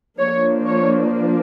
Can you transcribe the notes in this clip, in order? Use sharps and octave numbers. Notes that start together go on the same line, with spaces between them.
F3 A#3 D4 C#5
C#5